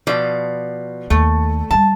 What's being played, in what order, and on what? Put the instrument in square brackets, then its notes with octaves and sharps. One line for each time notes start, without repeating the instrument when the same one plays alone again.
[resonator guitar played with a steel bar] B2 F3 D5
[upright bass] D#2 [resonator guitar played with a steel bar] A3
[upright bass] F#3 G3 [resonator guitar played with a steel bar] A5